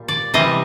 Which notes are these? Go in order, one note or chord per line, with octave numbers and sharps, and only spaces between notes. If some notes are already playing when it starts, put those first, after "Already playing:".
Already playing: A#2 G3
D5
C3 E3 G3 D#5